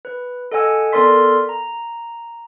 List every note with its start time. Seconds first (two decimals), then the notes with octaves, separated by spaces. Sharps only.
0.05 B4
0.52 A4 D#5 F#5 G#5 E6
0.93 B3 A4 A#4 D5 C6 B6
1.49 A#5